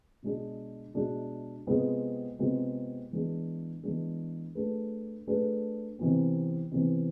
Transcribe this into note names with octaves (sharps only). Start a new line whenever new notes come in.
B2 G#3 D4 G#4
B2 G#3 D4 G#4
C3 G#3 B3 F4 G#4
C3 G#3 B3 F4 G#4
E3 G#3 B3 D4 G#4
E3 G#3 B3 D4 G#4
A3 D4 G#4 B4
A3 D4 G#4 B4
C3 E3 B3
C3 E3 B3